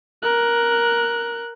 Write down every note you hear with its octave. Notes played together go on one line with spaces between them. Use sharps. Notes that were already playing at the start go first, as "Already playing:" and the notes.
A#4 F#6